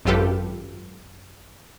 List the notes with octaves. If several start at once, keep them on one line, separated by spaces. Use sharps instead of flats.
G#1 F#2 F4 G4 A4 B4